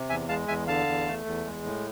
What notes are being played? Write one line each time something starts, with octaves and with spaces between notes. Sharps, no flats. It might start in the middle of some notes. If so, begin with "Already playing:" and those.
Already playing: C3
E2 E5 G#5
G#3 F5 A5
E2 E5 G#5
D3 F5 A5
E2
A3
E2
G#3
A2